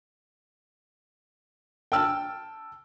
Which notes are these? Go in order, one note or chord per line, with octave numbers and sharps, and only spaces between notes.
G5 A5 E6 F6